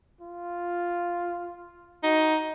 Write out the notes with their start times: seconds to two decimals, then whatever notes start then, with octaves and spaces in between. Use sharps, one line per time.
0.21 F4
2.03 D#4 F#4